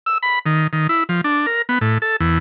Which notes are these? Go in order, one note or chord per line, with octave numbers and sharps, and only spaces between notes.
E6
B5
D#3
D#3
E4
F3
D4
A#4
B3
A2
A4
E2